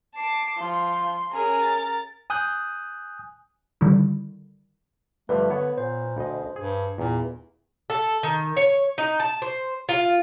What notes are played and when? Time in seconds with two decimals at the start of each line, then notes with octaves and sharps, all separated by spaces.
0.16 A5 D6 C7
0.58 F3 C6
1.32 C#4 G#4 A#4
1.63 A6
2.30 G#5 D#6 F#6 G6
3.81 D3 D#3 G3 E4
5.29 G2 D3 F3 A3 B4
5.50 D3 B3 C#5
5.78 A#2 C5
6.17 D2 B2 D#5
6.56 G2 G#4
6.98 E2 A#2
7.90 A4
8.23 D#3
8.57 C#5
8.98 D#4
9.20 A5
9.42 C5
9.89 F4